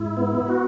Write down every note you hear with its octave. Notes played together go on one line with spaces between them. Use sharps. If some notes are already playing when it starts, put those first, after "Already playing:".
Already playing: G#2 E4
B3
E4
F#4